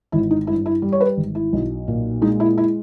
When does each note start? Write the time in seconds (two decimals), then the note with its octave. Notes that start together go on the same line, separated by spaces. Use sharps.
0.12 G#1 E4
0.31 D#4
0.47 G2 E4
0.66 E4
0.82 G3
0.93 C#5
1.01 B4
1.17 G#1
1.35 E4
1.53 B1
1.88 A#2
2.22 G#3 D#4
2.40 E4
2.58 E4